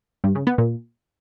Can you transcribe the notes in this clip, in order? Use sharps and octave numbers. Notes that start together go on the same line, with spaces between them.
G2
C#3
B3
A#2